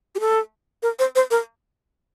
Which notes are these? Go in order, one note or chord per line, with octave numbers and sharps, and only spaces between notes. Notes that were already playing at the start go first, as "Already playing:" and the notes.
G4
A4
A#4
C5
C5
A#4